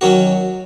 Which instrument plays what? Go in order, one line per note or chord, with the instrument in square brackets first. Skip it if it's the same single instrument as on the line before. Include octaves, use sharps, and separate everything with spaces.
[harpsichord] D#3 F#3 C#4 F#4